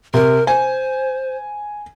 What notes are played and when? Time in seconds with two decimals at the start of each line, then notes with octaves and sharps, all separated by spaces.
0.14 C3 A#4
0.47 C5 G#5